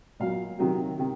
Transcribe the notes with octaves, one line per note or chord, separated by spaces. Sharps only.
A#2 F#3 F5
C3 D#3 F#3
C3 D#3